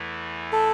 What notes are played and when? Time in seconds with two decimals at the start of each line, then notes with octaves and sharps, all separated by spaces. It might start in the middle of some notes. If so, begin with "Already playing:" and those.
Already playing: E2 E3 A3
0.52 A4